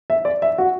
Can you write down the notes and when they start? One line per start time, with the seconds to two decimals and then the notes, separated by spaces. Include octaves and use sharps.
0.10 E5
0.25 D5
0.42 E5
0.58 F#4